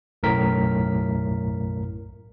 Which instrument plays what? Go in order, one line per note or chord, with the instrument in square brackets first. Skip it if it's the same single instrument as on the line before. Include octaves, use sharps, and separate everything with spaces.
[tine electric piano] B1 F#2 A2 A#4 B6